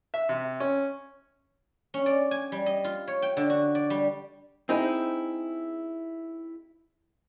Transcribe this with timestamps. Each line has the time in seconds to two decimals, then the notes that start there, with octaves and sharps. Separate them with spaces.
0.14 E5
0.29 C3
0.60 C#4
1.94 C#4
2.06 D5
2.31 G#5
2.52 G3
2.66 D#5
2.84 F4
3.08 C#5
3.22 G5
3.37 D3
3.50 F#4
3.75 D5
3.90 G3
4.69 C4 D#4 E4 G#4